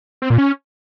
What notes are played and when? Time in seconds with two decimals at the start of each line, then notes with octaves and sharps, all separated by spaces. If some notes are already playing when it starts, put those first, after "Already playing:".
0.22 C4
0.30 A#2
0.38 C#4